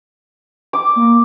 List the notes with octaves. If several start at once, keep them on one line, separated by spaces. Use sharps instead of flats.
D6
A#3